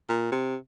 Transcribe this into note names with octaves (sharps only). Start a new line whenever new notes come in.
A#2
C3